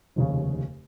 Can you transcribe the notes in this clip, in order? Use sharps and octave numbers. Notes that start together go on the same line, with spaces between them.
F1 D#2 C#3